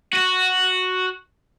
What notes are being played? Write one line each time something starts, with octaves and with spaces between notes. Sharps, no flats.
F#4